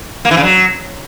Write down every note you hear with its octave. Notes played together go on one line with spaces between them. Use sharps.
A#3
E3
C#3
F#3